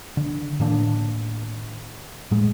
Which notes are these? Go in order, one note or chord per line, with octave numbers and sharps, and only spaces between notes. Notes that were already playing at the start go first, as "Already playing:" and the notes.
D3
A2 D#3 A#3 D4
A2 G#3